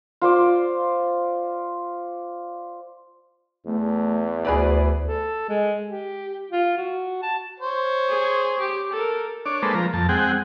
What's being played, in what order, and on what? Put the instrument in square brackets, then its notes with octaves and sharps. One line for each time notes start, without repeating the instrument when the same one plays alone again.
[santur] F4 C5 D5
[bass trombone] E2 [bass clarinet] A3
[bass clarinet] D2 [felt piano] G#4 B4 D5
[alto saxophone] A4
G#3
G4
F4
F#4
A5
[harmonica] C5 C#5
[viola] G#4
G4
A4 A#4
[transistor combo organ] D4 C#5 D6
G#3 A#3 A4 B4 C5
F3 A#5
F2 A5
G#3 C4 G#4 F#5 G5